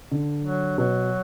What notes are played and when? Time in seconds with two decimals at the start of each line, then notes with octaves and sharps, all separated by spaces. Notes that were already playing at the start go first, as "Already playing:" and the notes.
0.12 D3
0.45 F#3
0.78 B2 F#3